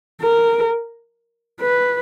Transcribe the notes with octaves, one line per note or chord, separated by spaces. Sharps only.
A#4
B4